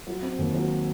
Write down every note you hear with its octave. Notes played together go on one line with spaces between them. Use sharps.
F#3
C4
D#2
F#3